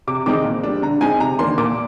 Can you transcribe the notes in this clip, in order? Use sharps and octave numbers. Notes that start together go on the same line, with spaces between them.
C3 D6
D#3 G#3 C4 D#4 D6
A#2
G3 D4
D3 A#5
G#3 C4 D#4 G#5
C3 A#5
D#3 A#3 D4 C6
A#2 D6